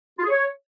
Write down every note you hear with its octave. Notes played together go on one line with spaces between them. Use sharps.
F4
G#4
C#5